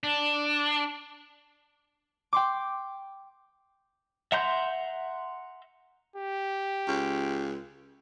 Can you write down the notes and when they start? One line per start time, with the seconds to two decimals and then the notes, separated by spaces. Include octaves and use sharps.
0.04 D4
2.33 G5 C6 D6
4.32 E5 F#5 A#5 C6 G6
6.16 G4
6.88 C#2